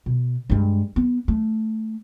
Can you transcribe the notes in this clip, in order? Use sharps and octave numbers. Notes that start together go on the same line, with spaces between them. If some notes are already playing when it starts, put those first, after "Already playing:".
B2
G2 G#3
B3
A3